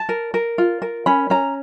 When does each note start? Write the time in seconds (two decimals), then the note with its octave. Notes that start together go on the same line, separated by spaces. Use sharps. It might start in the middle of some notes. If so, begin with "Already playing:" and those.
Already playing: A5
0.09 A#4
0.34 A#4
0.58 F4
0.82 A#4
1.06 C#4 B5
1.30 C#4 A#5